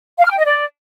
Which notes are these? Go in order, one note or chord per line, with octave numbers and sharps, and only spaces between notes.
F5
F6
G5
D#5
D5